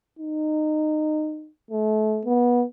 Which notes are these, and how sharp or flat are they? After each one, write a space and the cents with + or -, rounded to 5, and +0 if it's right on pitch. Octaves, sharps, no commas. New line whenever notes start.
D#4 -20
A3 -35
B3 -25